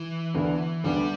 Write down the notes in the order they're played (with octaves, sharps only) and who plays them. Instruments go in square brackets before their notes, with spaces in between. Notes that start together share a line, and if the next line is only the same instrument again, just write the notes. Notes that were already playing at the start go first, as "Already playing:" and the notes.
Already playing: [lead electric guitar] E3
[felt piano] D2 D3 B3 D4
[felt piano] D2 D3 B3 D4 [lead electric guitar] G3